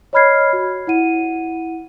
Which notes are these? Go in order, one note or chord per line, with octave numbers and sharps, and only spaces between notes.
C#5 D#5 B5 F6 G#6 C7
F#4
E4 F#5 D#7